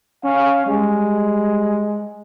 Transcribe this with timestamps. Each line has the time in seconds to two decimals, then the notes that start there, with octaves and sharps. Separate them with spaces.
0.24 C#4 F5
0.67 G3 G#3